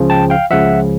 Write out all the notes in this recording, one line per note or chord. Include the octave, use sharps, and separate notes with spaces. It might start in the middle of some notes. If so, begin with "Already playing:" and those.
Already playing: C#2 C#3 F3
G5 A5
F5 G5
C#2 C#3 F3 E5 F#5